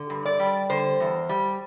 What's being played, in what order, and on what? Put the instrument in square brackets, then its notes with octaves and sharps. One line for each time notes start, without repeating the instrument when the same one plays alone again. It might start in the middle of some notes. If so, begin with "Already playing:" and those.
Already playing: [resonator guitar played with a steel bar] D3
G2
D5
G3
D3 C5
E2
G3